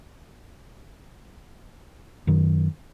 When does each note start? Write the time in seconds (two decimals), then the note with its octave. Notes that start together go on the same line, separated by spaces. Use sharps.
2.27 F#2 D#3